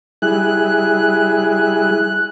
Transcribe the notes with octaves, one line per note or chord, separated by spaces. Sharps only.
G3 E4 G#4 F#6